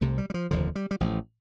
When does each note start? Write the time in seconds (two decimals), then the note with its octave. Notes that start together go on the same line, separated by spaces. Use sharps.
0.01 C2 C3 A3
0.18 G3
0.30 G3
0.34 F3
0.51 F1 D#2 D3 F3
0.75 G3
0.91 G3
1.00 A1 A2 F3